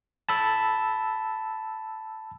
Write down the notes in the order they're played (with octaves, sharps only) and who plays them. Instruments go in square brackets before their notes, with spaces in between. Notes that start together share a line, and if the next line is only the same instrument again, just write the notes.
[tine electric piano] A5 B5 E6